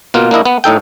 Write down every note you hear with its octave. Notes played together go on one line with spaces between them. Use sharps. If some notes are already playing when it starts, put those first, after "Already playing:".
B2 A#3 F4
A#3 D4 E4 D#5
B3
A2 D#4 A4 G5